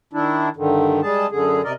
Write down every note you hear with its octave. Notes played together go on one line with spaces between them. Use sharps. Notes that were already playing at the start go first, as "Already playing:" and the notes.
D#3 D4 E4
G2 D3 D#3
G3 G#3 G#4 A5
F#2 D3 G#4
C3 A#4 D5 D#5